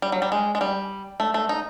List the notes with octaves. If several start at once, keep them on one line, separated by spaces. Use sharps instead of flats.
G3
F#3
G3
G#3
G#3
G3
A3
A3
D#4